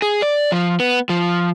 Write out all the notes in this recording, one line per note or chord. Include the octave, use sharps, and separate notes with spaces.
G#4
D5
F3
B3
F3